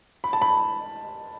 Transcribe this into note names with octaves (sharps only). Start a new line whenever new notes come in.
B5
A5
B5